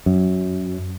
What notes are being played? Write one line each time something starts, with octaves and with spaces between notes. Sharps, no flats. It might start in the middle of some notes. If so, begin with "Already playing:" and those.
F#2